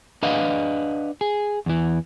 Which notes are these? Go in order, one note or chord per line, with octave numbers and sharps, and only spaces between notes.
D4 B4 D#5 F5 F#5
G#4
E2 E3